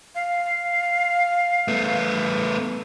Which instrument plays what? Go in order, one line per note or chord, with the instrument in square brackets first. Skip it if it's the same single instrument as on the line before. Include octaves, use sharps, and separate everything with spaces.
[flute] F5
[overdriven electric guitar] A3 B3